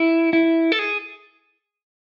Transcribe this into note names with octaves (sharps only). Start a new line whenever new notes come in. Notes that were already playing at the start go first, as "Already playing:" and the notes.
Already playing: E4
E4
A4
G#4